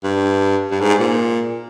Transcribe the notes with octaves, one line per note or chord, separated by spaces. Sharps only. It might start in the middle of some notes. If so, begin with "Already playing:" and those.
G2
G2
G#2
A#2